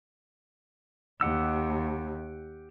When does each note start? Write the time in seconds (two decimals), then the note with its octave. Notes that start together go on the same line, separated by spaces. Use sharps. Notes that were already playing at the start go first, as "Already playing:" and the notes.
1.21 D#2 G4 F#5 E6